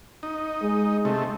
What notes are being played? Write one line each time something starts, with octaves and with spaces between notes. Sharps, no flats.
D#4
G#3
C3 A3